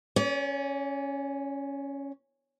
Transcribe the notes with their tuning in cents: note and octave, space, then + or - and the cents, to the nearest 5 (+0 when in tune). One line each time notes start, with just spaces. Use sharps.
C#4 +0 D5 -45